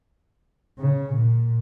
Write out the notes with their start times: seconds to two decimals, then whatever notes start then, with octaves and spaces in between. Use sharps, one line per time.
0.79 C#3
1.14 A#2